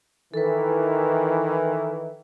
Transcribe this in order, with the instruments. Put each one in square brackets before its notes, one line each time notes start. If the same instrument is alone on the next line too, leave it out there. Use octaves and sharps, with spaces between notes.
[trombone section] D#3 E3 [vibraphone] A4 B4